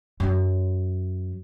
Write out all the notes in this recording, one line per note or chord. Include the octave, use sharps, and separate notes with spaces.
F#2 F#3